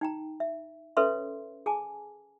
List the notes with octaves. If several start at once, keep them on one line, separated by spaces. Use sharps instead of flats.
D#4 G5 A#5
E5
C#4 A4 B4 C#5 E5 C6
G#4 G#5 A5 D6